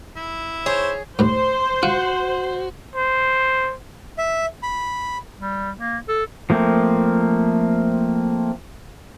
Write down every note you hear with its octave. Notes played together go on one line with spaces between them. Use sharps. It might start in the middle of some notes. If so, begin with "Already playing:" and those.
E4
G#4 C5 C#5
D#2 A2 C5
F4 F#4
C5
E5
B5
G3
A#3
A4
F3 A3 A#3 C4